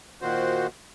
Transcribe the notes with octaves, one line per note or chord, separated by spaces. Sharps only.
A#2 D#3 F#4 C5